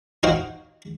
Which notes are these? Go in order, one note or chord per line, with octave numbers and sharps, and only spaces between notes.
D#4 F#4 C5 F5 G5 C6